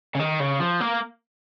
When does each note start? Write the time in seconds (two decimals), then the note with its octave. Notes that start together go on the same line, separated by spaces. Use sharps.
0.15 C#3
0.19 D#3
0.40 C#3
0.61 F3
0.81 A#3